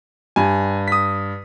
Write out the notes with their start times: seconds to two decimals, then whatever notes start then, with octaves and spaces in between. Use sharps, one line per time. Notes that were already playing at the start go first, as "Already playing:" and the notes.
0.36 G2 G3 G#5
0.88 D#6 B6